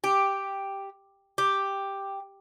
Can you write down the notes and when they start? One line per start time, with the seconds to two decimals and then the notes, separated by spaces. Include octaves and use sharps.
0.04 G4
1.38 G4